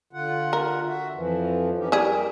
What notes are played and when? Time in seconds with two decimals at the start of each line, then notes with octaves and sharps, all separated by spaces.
0.13 D3 F4 F#5
0.53 A#4
0.87 F#4 E5
1.15 F2 E3 F3
1.78 C#4 D#4 G4
1.92 G3 E4 G4 G#4 A#4